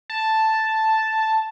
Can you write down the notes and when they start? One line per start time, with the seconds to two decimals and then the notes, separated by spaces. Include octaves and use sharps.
0.10 A5